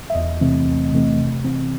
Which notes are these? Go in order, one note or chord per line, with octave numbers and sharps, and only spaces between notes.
E5
E2 D#5
C3 E3 A3 C4
E2
C3 E3 A3 C4
C3
E3 C4